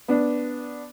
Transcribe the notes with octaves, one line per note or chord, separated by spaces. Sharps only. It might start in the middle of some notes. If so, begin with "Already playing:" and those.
B3 D4